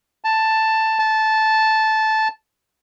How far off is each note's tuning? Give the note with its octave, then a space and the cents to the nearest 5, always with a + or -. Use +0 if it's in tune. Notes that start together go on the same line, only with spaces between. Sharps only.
A5 +5
A5 -10